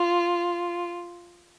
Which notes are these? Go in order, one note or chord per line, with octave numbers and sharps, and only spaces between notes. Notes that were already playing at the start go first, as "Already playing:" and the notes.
Already playing: F4